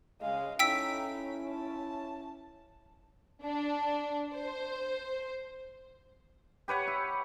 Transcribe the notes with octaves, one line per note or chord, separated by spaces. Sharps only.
C#3 G#3 D#5 F5
C#4 D#4 E4 A4 G5 E6 B6
A5
D4
C5
G4 B4 C#5 F#5
E4